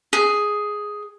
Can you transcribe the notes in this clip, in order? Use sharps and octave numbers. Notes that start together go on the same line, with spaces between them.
G#4